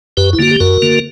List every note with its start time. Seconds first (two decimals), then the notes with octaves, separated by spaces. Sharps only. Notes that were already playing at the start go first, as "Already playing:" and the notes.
0.17 F#2 G4 B4
0.33 E4
0.39 D3 A#3 F#4
0.51 G4
0.60 F#2 F#4 A#4
0.82 D3 A#3